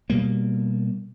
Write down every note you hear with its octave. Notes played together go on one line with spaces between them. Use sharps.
B2 G3 A#3